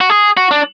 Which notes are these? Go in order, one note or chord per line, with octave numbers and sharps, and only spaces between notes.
F#4
G#4
F#4
D4